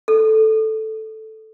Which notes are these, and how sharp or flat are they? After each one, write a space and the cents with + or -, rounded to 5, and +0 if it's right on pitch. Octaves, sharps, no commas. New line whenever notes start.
A4 -5